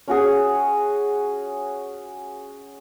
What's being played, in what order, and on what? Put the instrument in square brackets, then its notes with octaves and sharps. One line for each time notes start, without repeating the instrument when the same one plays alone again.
[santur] C#4 F#4 G#4